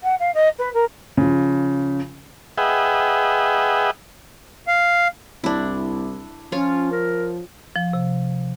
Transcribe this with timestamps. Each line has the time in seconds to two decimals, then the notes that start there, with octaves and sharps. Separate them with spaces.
0.03 F#5
0.19 F5
0.34 D#5
0.58 B4
0.73 A#4
1.17 C#3 F3
2.58 G#4 B4 D#5 E5 F#5 G5
4.67 F5
5.44 C2 D4 E4
6.52 F3 C#4 F4 C#5
6.91 A#4
7.76 F3
7.93 C3